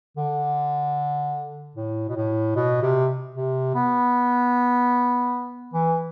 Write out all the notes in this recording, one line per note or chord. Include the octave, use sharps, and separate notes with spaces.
D3
A2
B2
A2
B2
C3
C3
B3
E3